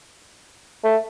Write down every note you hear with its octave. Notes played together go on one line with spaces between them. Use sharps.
A3